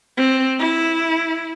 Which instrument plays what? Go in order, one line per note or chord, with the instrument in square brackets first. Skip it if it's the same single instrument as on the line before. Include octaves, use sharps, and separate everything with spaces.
[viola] C4
E4